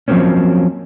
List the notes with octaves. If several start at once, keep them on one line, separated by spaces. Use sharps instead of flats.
F3 F#3 A#3 C4 C#4